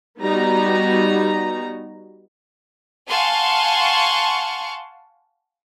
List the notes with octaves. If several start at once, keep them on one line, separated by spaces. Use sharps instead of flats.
G3 B3 D#4 F#4 A#5
F5 F#5 G#5 A5 C6 C#6